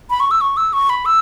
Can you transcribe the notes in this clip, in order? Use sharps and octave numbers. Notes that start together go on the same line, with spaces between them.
B5
C#6
E6
C#6
E6
C#6
B5
E6